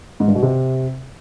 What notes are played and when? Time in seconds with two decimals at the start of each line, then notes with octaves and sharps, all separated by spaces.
0.20 G#2
0.28 G2
0.35 B2
0.43 C3